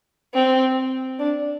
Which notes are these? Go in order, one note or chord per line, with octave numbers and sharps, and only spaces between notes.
C4
D4